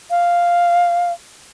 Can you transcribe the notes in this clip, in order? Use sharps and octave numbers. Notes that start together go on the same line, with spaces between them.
F5